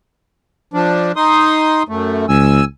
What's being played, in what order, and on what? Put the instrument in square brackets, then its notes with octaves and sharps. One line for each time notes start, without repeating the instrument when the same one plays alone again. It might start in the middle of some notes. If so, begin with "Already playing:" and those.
[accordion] F3 D4
D#4 C6 D#6
F#2 A3
[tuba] C#2 [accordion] G#5 E6